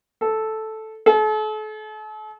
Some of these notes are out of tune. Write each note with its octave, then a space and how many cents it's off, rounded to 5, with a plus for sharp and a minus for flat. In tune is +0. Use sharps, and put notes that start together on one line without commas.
A4 -5
A4 -40